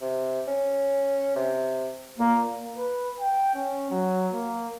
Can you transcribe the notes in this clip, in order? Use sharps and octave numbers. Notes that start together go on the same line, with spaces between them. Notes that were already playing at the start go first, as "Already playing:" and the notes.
C3
C#4
C3
A#2 A#3
B4
G5
C#4
F#3
A#3